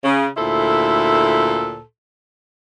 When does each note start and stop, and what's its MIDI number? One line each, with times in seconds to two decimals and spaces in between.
0.04 0.26 49
0.37 1.79 38
0.37 1.79 46
0.37 1.79 64
0.37 1.79 69
0.37 1.79 72